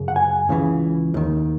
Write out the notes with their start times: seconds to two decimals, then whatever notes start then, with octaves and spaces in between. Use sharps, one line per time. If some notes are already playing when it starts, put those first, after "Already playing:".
Already playing: F#2 C#3
0.08 F#5
0.16 G#5
0.49 C#2 C#3 E3
1.14 D#2 D#3